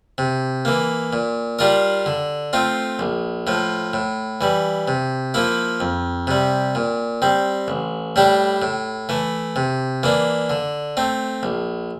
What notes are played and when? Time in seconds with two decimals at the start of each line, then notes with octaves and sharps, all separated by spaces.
0.18 C3
0.65 E3 A#3
1.13 A#2
1.59 G3 D4 F4 A#4
2.06 D3
2.53 A3 C4 F4
2.99 A#1
3.47 A2 F3
3.93 A2
4.41 E3 G3
4.88 C3
5.34 F3 A#3 E4
5.80 F2
6.27 C3 G3
6.75 A#2
7.22 G3 C4
7.68 A1
8.16 A2 G3 D4 G4
8.62 A2
9.09 E3 A3
9.56 C3
10.03 E3 A#3 D4
10.50 D3
10.97 A3 C4
11.43 A#1